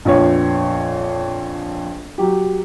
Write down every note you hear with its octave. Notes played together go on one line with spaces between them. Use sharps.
A#1 F2 B3 C#5
F#3 G4